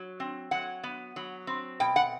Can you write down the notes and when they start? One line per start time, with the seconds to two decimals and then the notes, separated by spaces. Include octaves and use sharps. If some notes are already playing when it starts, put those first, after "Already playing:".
Already playing: F#3
0.20 C4
0.51 F#3 F#5
0.84 B3
1.16 F#3
1.47 C4
1.80 B2 G5
1.96 F#5